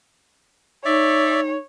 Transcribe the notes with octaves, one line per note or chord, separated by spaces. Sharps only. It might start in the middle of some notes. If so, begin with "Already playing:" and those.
D#4 C#5 D5 E5